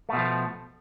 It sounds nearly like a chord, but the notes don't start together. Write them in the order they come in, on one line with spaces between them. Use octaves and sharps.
A3 B2 F3